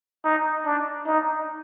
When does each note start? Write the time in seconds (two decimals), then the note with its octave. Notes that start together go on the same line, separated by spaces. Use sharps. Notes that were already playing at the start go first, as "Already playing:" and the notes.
0.25 D#4
0.66 D4
1.07 D#4